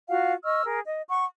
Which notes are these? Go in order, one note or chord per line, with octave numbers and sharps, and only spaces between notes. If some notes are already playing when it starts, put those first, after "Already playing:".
F4 F#4 F5 F#5
D#5 C#6 E6 F6
G#4 A#4
D#5
F#5 C#6